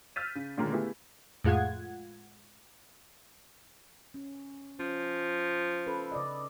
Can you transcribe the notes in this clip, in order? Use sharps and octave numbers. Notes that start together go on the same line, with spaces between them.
E6 F6 G6 A6 B6 D#7
C#3
A#2 D3 D#3 G#3 A#3 C#4
A3 B3 E4 G4 G#4
F2 A2 G#3 F4 F#5 G#6
C#4
F3 C#4
C#4 A4 B4
C#3 D5 D#5